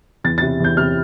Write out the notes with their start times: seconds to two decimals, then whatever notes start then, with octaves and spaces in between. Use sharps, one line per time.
0.24 E2 A6
0.38 C3 A6
0.60 E2 G6
0.77 C3 F6